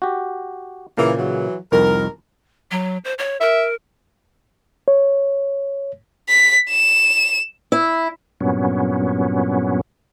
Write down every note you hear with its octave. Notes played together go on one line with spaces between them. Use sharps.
F#4 G4
A#2 C#3 E3 A#3
E3 F#3
C2 F2 D#3 A#4
F#3
C5
C#5
A#4 E5
C#5
B6
E7
E4
G2 A#2 F#3 B3 C#4